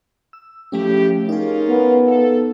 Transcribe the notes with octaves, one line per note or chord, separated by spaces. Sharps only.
E6
A2 C#3 F3 A3 C#4 G4
C#4 D#4 F4 G#4 A#4
B3
A4